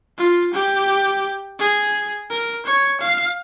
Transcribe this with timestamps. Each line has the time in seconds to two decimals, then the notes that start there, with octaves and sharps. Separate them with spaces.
0.18 F4
0.53 G4
1.59 G#4
2.30 A#4
2.65 C#5
3.01 F5